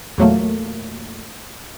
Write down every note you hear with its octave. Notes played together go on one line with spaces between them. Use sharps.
E2 A#2 F#3 A3 A#3